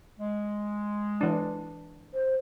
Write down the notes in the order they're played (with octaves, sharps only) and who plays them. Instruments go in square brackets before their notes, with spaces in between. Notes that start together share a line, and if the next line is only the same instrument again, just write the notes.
[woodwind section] G#3
[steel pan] E3 D4
[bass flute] C5